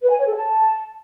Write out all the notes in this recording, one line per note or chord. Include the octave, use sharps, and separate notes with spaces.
B4
G#5
C#5
A4
A5